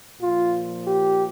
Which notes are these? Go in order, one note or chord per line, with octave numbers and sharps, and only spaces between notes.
A#2 F3 F4
G4